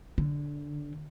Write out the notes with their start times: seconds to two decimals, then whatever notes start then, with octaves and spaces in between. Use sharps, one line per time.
0.18 D3